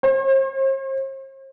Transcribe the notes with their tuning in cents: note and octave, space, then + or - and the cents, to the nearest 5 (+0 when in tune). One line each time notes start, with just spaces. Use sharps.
C5 +45